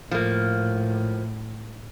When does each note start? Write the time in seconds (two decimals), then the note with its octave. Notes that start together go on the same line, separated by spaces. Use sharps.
0.11 A2 F3 A#3